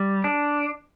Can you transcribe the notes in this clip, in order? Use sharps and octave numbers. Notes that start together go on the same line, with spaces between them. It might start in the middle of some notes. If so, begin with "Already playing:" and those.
Already playing: G3
D4